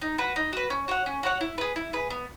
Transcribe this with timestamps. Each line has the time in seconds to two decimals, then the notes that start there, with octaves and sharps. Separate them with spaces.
0.02 D#4
0.18 F#4 B4
0.36 D#4
0.53 F#4 B4
0.70 C#4
0.88 F#4 C#5 F#5
1.06 C#4
1.23 F#4 C#5 F#5
1.41 E4
1.58 G#4 B4
1.76 E4
1.93 G#4 B4
2.10 B3